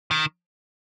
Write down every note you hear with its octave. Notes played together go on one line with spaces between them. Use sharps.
D#3